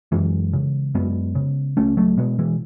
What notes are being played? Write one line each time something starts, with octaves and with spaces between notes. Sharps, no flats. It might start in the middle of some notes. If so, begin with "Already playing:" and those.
F#2 E3 G#3
C#3
F#2 G#3 B3
C#3
C#2 A3 C#4
F#3 A3
B2 G#3 B3
E3 G#3